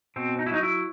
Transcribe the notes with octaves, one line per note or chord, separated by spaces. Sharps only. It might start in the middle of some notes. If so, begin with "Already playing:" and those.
B2 C4
D#4
E4
F#3 D#4
E4